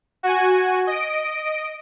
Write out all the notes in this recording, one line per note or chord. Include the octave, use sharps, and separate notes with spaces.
F#4 G#5
D#5 D7